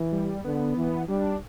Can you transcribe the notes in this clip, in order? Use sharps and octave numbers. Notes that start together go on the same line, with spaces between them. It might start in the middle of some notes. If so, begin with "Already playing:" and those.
Already playing: E3
G3
D3 B3
E3
G3 D4